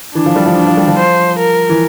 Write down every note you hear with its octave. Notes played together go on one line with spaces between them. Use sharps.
E3 D4
F3
G3
F3
D4
F3
G3
F3
C5
A#4
E3